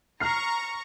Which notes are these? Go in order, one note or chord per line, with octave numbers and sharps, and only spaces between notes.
A#5 C#6 F6 C7